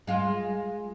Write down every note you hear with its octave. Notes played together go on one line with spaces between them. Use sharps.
G#3 F4